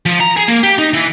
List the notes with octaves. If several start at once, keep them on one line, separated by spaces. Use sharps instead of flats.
F3
A#5
G#4
A#3
G4
D#4
E3